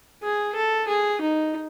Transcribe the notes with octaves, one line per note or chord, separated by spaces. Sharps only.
G#4
A4
G#4
D#4